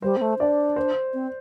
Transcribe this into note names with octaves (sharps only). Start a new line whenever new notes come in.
G3 C5
C4
A3
D4 D5
C5
C4